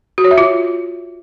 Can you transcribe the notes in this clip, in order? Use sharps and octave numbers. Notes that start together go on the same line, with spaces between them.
F#4
C#5
E5
F4